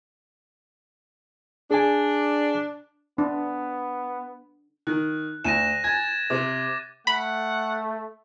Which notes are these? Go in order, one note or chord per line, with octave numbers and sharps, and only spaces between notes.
D4 G#4 G#5
B3 D4
D#3 F#6
D2 A#6 D#7 E7
G#5 G#6 A6
C3 D6
A3 F#5 B5